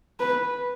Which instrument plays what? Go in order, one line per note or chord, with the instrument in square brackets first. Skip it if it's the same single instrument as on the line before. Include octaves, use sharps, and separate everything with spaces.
[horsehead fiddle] B4